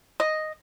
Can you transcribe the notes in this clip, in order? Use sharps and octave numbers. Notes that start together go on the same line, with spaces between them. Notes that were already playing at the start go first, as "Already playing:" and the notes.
D#5